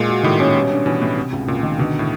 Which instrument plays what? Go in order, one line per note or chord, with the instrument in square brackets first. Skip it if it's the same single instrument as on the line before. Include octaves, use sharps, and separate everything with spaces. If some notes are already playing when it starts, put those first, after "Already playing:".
Already playing: [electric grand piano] A#2 [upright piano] G#3
[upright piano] F#4
[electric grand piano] A2 [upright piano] D#3
[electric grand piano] A#2 [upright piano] C#4
[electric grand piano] B2 [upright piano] G3
[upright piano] D4
[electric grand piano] B2 [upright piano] E3
[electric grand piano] A2 [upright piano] B3
[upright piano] C3
C#2
[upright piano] C#2 [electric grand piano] A#2
[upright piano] D#3
[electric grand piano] B2 [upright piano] D3
[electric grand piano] A2